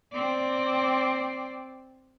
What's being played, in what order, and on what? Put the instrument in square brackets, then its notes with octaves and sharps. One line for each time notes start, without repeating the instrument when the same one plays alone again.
[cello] C4 D5